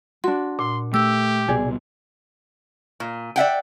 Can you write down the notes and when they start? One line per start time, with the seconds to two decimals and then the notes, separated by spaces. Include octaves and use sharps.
0.24 D4 F#4 C6
0.59 A#2 C6
0.94 A3 G4 E6
1.48 C2 B2 G#4 D5
3.00 A#2
3.36 D5 E5 F#5 G5